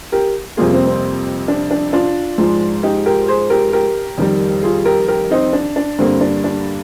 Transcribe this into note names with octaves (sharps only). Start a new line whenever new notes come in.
G4 A#4
F2 C3 G3 A#3 F4 G#4
C4
C4
D4
D4
D4 F4
G#2 F3 G#3
D#4 G4
G4 A#4
G#4 C5
G4 A#4
G4 A#4
F2 D#3 G3
F4 G#4
G4 A#4
G4 A#4
C4 D#4
D4
D4
G2 D3 G3 A#3 C4
D4
D4